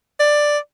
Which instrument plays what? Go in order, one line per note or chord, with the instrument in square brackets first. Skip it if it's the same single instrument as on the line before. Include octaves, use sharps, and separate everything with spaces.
[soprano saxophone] D5